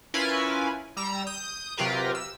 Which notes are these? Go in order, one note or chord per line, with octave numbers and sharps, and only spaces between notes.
C#4 E4 F4 A#4 B4 G#5
G3 A#5 E6
D#6 G6
C3 F#3 F4 G4 A#4 B4
E6